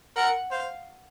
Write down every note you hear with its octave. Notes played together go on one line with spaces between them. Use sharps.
A#4 F#5
C5 F5